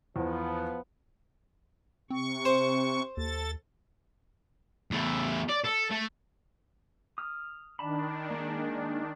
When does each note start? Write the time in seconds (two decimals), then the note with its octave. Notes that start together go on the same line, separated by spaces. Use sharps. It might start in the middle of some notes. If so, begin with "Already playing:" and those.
0.16 E2 F3 B3
2.10 C3 C4 C#6
2.45 C5
3.17 D#2 A4 A6
4.91 E2 A3
5.49 D5
5.64 A4
5.90 A3
7.18 D#6 F6
7.79 D#3 D4 A5 B5
8.31 G#3 A#3